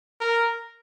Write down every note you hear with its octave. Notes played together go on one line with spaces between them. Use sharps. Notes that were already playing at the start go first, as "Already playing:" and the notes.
A#4